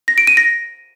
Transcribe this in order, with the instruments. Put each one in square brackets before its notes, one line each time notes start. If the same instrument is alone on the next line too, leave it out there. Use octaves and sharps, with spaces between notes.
[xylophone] A#6
D7
D#7
A#6